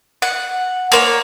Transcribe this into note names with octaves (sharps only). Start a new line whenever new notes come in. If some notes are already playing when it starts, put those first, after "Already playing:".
F#5
A#3 C5 C#5